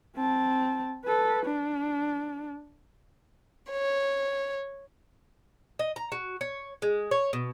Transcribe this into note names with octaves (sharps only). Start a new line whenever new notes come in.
C4 A5
A4 B4
D4
C#5
D#5
A#5
F#4
C#5
G#3
C#5
B2